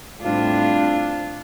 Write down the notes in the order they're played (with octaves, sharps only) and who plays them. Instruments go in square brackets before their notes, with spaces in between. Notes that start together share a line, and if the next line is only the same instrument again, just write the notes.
[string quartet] A2 G3 C4 D4 F4